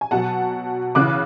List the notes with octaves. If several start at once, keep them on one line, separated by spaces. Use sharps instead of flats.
G#5
B2 F#3 F#5 A5
C#3 E3 D6 F#6